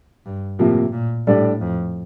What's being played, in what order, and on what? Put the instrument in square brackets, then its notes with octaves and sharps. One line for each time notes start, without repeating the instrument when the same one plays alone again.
[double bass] G2
[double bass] A2 [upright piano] C3 F3 A#3
[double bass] A#2
[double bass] A2 [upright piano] G3 D4 A4 D5
[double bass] F2